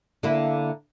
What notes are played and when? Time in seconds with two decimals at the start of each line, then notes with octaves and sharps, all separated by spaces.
0.23 D3 A#3 E4